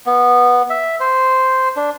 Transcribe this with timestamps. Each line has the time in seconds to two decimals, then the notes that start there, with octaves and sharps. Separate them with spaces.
0.06 B3
0.70 E5
1.00 C5
1.76 D4